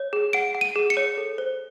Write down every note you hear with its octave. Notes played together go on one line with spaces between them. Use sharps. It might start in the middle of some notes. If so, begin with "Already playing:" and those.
Already playing: C#5
G#4
F#5 D7
F#5
D#7
G#4
C#7
C#5
A4
C5